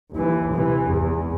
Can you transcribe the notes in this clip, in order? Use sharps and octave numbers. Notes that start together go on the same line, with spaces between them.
D#2 E3
C3 E3
G#1 E2